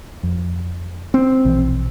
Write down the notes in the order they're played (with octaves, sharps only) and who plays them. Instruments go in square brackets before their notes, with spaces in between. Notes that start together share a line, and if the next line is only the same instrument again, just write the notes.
[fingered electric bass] F2
[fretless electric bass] C4
[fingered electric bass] A#1 B2 E3